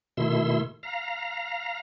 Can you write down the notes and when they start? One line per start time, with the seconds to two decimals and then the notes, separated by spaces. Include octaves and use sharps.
0.17 B2 D#3 A3 E4 C6 E6
0.83 F5 A#5